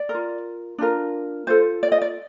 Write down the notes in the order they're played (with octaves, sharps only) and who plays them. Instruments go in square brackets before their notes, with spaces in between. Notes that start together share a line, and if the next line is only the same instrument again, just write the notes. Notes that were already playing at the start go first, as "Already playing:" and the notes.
Already playing: [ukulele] D5
A#4
F4
D4 F4 A#4
F4 A4 C5
D5
D#5
D5